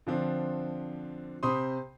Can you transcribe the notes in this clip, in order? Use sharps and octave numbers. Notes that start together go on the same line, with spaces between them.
D3 F3 C4 D4
C3 C5 B5 C6 D#6